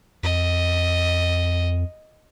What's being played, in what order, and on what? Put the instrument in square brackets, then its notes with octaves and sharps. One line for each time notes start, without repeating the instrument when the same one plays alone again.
[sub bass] F2 [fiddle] D#5